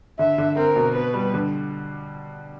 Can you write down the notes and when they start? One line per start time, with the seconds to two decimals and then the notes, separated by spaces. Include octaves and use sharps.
0.19 D3 E5
0.38 D3
0.57 C4 A#4
0.76 B2
0.95 B3 B4
1.14 G3
1.34 D3